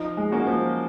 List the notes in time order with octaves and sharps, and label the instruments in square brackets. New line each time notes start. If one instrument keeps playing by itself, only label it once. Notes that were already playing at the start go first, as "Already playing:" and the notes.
Already playing: [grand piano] F3 [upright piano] D#4
[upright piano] G#3
[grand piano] A#3 C#4 F#4
[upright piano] F3